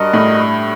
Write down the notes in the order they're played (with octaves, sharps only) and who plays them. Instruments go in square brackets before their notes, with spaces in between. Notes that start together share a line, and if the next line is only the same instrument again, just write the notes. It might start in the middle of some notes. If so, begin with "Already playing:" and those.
Already playing: [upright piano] G2 [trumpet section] F#4 A#4 D#5
[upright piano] A2